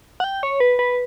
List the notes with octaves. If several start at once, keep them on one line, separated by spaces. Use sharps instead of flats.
F#5
G5
C#5
B4
B4